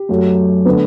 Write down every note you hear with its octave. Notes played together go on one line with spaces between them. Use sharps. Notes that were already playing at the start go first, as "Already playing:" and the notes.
Already playing: G4
F#2 F#3 A3
D3 A3 B3